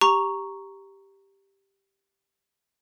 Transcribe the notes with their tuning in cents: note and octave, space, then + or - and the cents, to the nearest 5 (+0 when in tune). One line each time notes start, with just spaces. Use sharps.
G4 +0 A#5 +0 C#6 +0